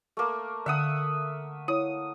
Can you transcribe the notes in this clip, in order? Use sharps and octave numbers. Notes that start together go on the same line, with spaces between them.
A3 A#3
D3 E5 F#5 D#6
E4 C#5 D#6